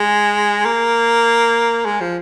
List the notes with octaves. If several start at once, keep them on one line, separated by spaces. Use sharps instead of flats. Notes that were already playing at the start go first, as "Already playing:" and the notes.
Already playing: G#3
A#3
G#3
F3